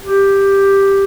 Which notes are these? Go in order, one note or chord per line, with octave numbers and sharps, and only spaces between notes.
G4